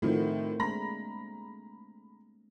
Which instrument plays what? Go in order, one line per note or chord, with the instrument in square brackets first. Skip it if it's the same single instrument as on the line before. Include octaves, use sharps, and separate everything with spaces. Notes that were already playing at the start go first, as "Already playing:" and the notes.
[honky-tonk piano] A2 D#3 F3 [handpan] A3 C4 F#4
[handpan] G#3 A#3 D4 [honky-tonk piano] A#5 B5 A#6